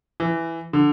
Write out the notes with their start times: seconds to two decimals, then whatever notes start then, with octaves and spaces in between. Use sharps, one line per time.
0.20 E3
0.73 D3